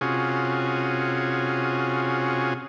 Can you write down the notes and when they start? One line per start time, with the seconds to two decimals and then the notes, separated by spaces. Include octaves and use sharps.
0.01 C3 C#4 F4 F#4 G#4